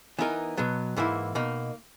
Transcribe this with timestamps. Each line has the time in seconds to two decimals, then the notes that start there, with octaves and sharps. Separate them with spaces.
0.19 E3 B3 D#4 A#4
0.57 B2 F#3 B3
0.97 G#2 E3 A#3 E4
1.35 B2 A#3 D#4